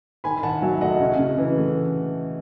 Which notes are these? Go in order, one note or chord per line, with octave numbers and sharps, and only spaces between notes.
D#3 G#5 B5
D#3 F#5 A5
F#3 E5 G#5
A3 D#5 F#5
C#3
C#3
E3
A3